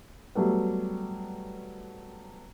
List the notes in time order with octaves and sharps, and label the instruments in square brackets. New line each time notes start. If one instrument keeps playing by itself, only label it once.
[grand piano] F#3 G3 A3 B3